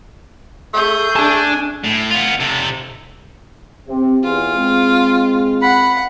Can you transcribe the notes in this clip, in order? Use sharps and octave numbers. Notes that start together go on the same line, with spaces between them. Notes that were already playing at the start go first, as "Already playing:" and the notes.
A3 G#4 G6
D4 G#5 A5
A2
B3 F4
C3 A4
C3 C4
E2 F4 G#4
G#3 C4
F#5 B5